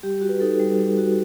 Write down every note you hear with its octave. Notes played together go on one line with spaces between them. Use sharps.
G3 G4
F#4
B4
D#4 A4
G3
G3
F#4